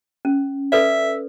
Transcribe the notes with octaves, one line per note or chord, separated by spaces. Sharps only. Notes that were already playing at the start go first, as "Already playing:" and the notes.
C#4
A4 B4 D5 E5